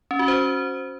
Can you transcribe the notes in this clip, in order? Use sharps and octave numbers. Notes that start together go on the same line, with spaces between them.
C#4
F#4
C5